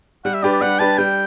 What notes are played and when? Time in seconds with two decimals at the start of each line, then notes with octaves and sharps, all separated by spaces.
0.25 G3 F#5
0.34 E5
0.42 D4 G4 B4 D5
0.53 D5
0.61 G3 F#5
0.79 D4 G4 B4 A5
0.98 G3 G5